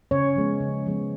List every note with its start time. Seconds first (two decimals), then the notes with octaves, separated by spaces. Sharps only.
0.11 C#3 C#4 C#5
0.36 F3 G#3 B3
0.61 C#3
0.86 F3 G#3 B3